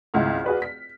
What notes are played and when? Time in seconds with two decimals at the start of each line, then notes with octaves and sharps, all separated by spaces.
0.14 G#1 C#2 E4 F#5 F6
0.45 F#4 G#4 B4 D5
0.62 B6